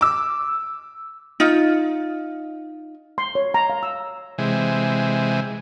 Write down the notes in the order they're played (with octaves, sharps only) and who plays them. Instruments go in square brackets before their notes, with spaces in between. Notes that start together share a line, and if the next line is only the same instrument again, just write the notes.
[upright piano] D6 E6
[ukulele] D#4 F4
[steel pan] C6
C#5
A#5
F5
E6
[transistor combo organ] C3 E3 G#3